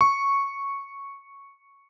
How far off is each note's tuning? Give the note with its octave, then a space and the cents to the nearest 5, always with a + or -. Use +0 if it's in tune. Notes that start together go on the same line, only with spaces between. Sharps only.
C#6 -5